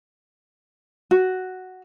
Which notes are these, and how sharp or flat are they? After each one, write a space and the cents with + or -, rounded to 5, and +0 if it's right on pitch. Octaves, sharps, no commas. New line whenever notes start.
F#4 +5